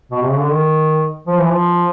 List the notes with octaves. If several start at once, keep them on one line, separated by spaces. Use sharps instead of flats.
B2
C3
C#3
D3
D#3
F3
E3
F3